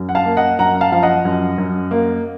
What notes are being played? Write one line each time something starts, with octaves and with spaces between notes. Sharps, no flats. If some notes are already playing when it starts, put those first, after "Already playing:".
Already playing: F#2
F#5
F5 A5
A#3
D#5 F#5
F#2 F#5 A#5
F5 A5
F3 F5
D#5 F#5
F#2
F#2
A#3